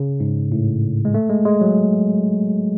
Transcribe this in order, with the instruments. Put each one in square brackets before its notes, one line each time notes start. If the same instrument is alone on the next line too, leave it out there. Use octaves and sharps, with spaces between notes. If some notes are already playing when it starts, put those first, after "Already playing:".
Already playing: [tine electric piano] C#3
G#2
A2
G#3
A3
G#3
G#3
F#3